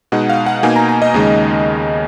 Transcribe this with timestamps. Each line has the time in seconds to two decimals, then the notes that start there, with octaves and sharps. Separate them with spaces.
0.12 B2 G#3 D#4 F#5
0.29 F5
0.46 F#5
0.63 B2 A#3 D#4 G#5
0.76 A#5
0.89 A#5
1.02 D#5
1.14 D#2 C#3 G#3 D#4